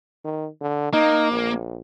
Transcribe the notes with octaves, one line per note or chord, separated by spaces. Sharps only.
D#3
D3
A#3 D#4
A#1